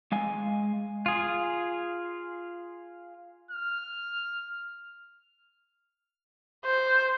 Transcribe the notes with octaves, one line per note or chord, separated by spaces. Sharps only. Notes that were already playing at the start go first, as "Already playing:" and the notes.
G#3 F5 G#5
F4 G#4
F6
C5